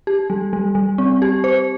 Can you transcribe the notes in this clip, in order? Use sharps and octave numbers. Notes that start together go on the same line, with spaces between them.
G4
G3
G3
G3
C4
G4
C5